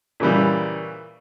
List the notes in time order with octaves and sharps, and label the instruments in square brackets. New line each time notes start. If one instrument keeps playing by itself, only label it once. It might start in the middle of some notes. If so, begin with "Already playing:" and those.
[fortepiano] A#2 C#3 E3 G3